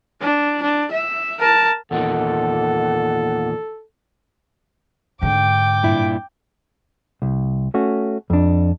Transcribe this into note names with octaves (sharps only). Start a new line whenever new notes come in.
D4
D4
E5
A#4 A5
E2 A#2 D#3 A4 F#5
G#2 D3 G5 D6
G2 A#2 E4
C2
A3 C#4 F#4
F2 D4